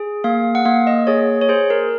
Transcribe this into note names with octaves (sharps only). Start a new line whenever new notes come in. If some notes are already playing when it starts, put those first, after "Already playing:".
Already playing: G#4
A#3 F5
F#5
A#3 F5
D#5
G#4 C#5
C#5
G#4 C5
A#4